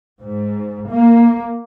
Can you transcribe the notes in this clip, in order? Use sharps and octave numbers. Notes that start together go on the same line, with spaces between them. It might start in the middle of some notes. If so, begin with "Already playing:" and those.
G#2
A#3